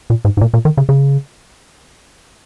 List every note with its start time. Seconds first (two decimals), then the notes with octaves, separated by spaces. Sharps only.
0.10 A#2
0.25 G#2
0.37 G#2
0.41 A#2
0.54 A#2
0.65 D#3
0.77 C#3
0.89 C#3